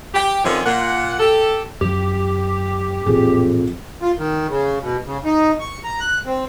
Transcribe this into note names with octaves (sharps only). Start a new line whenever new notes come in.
G4
F2 D3 D#3 F3 C#4 C#5
A#2 F#5
G4 A4
F#2 F3 G4
A1 F2 A#2 G#4
F4
D#3
C#3
B2
C#3
D#4
C#6
A#5
F#6
C4